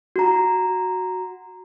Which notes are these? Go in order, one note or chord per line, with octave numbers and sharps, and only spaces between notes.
F#4 A#5